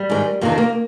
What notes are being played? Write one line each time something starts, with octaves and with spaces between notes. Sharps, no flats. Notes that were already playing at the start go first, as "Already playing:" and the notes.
Already playing: G3
G#2 D#3
F2 C3 D#3 A#3
C4
A#3